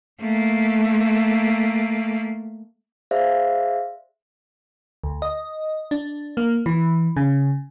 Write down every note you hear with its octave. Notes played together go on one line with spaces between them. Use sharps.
A3 A#3
G#4 C5 D5 E5 F5
D2
D#5
D4
A#3
E3
C#3